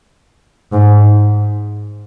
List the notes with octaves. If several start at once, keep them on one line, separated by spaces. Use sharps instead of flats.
G#2